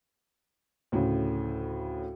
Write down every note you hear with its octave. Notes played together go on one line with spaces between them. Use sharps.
D2 A2 C#3